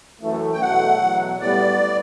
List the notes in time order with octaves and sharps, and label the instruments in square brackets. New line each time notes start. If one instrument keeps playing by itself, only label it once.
[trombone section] F#2 E3 A3
[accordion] G5
[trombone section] E2 B2 F#3 A3 [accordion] F#5
[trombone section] E2 B2 F#3
[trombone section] A2 G3 B3 [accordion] D5